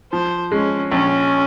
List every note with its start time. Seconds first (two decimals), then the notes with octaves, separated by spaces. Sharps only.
0.12 F3 C5
0.52 G#3 C#4
0.91 A#1 C#4